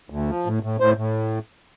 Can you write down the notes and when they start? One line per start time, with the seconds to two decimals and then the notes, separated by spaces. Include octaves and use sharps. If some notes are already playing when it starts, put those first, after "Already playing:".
0.10 D2
0.29 F3
0.46 A2
0.63 A2
0.80 A2 C5
0.97 A2